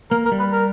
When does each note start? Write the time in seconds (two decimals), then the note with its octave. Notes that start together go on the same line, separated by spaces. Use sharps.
0.11 A#3 A#4
0.25 A#4
0.32 G3
0.39 B4
0.52 A#4